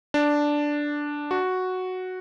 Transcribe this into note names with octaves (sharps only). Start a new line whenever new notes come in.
D4
F#4